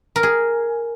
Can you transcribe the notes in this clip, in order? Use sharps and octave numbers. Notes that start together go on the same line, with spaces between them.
A#4
G#4